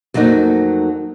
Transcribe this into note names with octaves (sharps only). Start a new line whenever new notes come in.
F2 F#3 A3 A#3 D#4